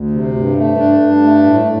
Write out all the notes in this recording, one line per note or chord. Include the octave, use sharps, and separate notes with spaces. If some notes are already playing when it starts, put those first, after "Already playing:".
Already playing: D2
C3
G2
A3
G2 D4
G2
A3
A2
A2